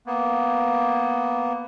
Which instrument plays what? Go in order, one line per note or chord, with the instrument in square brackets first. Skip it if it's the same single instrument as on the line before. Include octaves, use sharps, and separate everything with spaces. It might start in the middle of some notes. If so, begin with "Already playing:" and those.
[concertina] A#3 B3